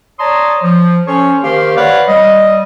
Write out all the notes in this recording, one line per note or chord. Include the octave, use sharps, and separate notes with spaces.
C#5 D5 A5 A#5 C6 D#6
F3
F3 C#4 A4 C5 C#5 C#6
D#3 A#3 G4 C5 F5
B4 C#5 D5 F5 F#5 B5
G3 D#5